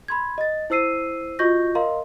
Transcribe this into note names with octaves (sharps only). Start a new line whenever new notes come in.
B5 C6 G#6
D#5 A6
E4 C5 E6 C7 D#7
F4 F#4 D#5 C#6 G6 A#6
A#4 D#5 F5 A#5 C6